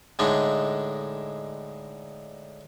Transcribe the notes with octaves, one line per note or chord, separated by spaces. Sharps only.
A2 D3 G#3 D4 D#4